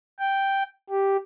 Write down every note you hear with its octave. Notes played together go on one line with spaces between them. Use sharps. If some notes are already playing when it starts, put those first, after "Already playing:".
G5
G4